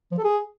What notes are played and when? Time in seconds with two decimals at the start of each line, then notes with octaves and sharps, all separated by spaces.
0.12 F3
0.18 A4
0.24 G#4